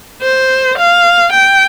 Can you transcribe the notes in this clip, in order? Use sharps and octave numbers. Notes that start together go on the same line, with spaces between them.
C5
F5
G5